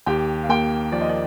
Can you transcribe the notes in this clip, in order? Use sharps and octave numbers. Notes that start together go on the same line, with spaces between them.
D#2 G4 G5
F5
A#3 G4 G5
F3 D5
D#5
D5